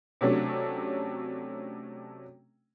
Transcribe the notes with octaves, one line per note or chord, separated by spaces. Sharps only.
C3 F#3 A3 C#4 D4